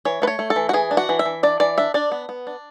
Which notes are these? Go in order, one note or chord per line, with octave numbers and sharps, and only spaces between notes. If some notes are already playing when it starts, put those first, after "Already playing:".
E3 C#5
A3 B4
C#5
A3
A4
E3
F#4
E3 G#4
D4
F#4
E3
E5
E3
D4 D5
E3 D5
D4 E5
D4 D5
B3
B3
D4